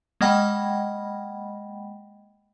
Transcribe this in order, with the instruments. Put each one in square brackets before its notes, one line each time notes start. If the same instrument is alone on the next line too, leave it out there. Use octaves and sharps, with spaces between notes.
[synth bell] G#3 A#3 D#5 F#5 G5 B5